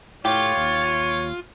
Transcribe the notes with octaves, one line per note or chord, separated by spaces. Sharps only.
A2 F4 G4 C#5
D#2